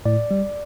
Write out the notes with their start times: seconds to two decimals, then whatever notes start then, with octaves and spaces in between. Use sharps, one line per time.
0.06 A2 D5
0.31 G3